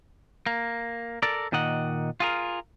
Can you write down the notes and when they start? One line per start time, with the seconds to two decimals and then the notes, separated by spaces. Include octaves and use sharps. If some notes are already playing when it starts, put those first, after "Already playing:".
0.46 A#3
1.23 A4 A#4 D5
1.52 A#2 D#3 A#3 D#5 F#5
2.20 F4 G#4 A#4